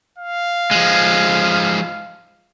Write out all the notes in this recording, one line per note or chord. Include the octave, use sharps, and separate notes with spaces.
F5
F3 G#3